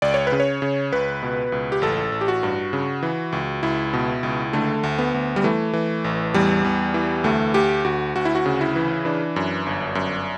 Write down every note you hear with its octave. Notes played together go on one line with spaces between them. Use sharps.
C#2 D5
C#5
B4
C#3
C#5
C#3
C#2 B4
B2
C#2
G4
A1 A4
A1
G4
F#4
G2
C#3
E3
C#2
C#2 E4
B2
C#2
D3 A3
D2
B3
D2
G3
E3 A3
E3
A1
E2 G3
E2
E3
D2 A3
D2 G4
D2 F#4
D2 F#4
E4
F#4
C#3
E4
E3
E3 D4
F#2
G1
F#2